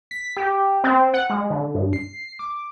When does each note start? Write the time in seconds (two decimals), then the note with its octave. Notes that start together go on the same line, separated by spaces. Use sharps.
0.11 B6
0.37 G4
0.84 C4
1.14 F#5
1.30 G#3
1.50 D3
1.75 G2
1.93 C7
2.39 D6